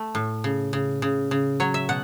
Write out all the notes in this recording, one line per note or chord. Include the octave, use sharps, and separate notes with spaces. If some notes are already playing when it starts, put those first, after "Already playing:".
Already playing: A3
A2
C#3
C#3
C#3
C#3
F#3 C#5
E5
B2 F#5